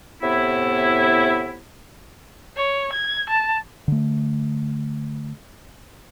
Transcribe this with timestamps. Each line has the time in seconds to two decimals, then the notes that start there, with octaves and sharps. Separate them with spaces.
0.21 A2 C3 B3 E4
2.56 C#5
2.93 G#6
3.29 A5
3.88 D3 A3